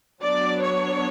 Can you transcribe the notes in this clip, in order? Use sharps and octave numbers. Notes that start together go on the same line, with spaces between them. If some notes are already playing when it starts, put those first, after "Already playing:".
F#3 B3 D4 D5
C#5